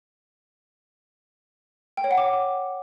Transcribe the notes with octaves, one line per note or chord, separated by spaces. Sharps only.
G5
C#5
F#5
D6